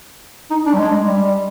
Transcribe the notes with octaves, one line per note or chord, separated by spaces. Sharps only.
D#4
D4
G3
G#3
G3